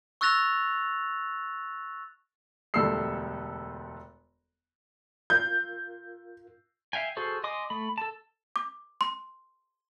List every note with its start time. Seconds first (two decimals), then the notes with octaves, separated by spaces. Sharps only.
0.21 C#6 E6 F#6 A6 A#6 F7
2.74 E1 D2 G3 A4 E6 C7
5.30 F4 A#4 F5 G6
6.93 E5 F5 G5 G#5
7.17 F#4 G#4 A4 C5
7.44 D#5 G#5 C6 D6 D#6
7.70 A3 B5
7.98 A4 A5
8.56 D6
9.01 C6